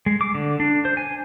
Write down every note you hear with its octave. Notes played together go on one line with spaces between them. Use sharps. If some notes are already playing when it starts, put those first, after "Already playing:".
G#3
D6
D3
D4
C5
G#5